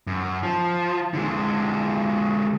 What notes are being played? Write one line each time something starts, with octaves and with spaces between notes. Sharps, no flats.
F#2
F3
D3 G#3